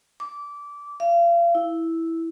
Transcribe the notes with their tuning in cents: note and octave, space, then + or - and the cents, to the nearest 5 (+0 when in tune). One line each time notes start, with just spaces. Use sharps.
D6 -20
F5 -35
E4 -5